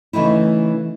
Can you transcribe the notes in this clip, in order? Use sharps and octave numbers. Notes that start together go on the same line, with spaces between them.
C#3 E3 A3 D#4 E4